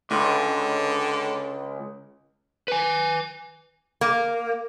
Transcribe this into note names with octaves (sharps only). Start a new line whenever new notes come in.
C#2 D3
B4 G#5
A#3